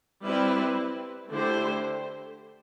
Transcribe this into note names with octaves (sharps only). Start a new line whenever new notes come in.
G3 C4 E4 B4
D3 A3 E4 G4 C5